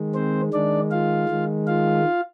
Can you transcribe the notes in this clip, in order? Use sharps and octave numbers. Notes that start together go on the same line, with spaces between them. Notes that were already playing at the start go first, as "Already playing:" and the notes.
Already playing: D#3 G#3
C4 C5
D#3 G#3 D4 D5
F4 F5
D#3 G#3
F4 F5